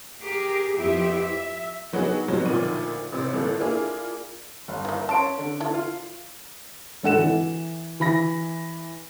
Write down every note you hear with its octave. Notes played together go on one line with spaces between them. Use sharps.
G4 G#4 A#4
F2 F3 B3 E4 G4 E5
E5
D#3 F#3 B3 D4 D#4 G#4
F2 G#2 B2 F#3 G3
D2 A#2 D#3 F3 D5 D#7
A1 C3 C5 E6
G1 A2 E3 A#3 A4
A#3 D4 E4 F4 G#4
G1
E3 A#3
C#4 A5 C6 D7
D3
E4 A4
F4
G#1 A4 F#5 E7
E3
E3 B5 A#6